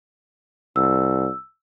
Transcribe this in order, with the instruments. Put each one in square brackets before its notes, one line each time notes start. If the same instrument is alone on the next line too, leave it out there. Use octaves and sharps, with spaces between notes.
[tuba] C2 [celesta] E6